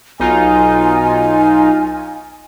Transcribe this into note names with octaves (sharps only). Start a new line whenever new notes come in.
B1 D#4 F4 G#5